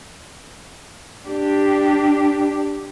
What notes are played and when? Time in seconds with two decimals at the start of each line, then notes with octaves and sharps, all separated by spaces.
1.26 D4 G4